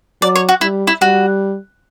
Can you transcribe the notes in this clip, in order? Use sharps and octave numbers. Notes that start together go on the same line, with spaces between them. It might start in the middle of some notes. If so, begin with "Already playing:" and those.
F#3 D5
C#5
F#4
G3 E4
E4
G3 F#4